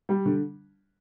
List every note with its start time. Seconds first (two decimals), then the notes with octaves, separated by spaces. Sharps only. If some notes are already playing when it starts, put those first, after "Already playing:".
0.09 G3
0.26 D3